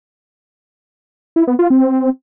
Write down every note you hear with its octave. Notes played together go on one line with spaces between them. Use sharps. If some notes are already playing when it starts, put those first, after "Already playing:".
E4
B3
F4
C4